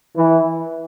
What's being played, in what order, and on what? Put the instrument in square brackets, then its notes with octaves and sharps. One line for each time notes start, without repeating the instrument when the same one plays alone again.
[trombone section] E3